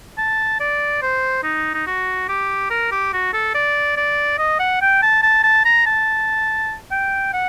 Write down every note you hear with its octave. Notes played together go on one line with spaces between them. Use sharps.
A5
D5
C5
D#4
D#4
F#4
G4
A#4
G4
F#4
A4
D5
D5
D#5
F#5
G5
A5
A5
A5
A#5
A5
G5
F#5